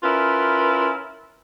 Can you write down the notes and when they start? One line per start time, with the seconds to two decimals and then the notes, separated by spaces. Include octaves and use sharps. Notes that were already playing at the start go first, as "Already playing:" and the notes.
0.03 C#4 E4 F4 A#4 B4